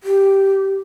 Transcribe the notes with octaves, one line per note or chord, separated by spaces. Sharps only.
G4